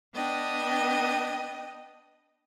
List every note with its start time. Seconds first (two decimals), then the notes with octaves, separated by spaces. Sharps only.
0.14 B3 D4 D#5 G5